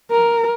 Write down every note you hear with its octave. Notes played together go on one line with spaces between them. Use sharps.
A#4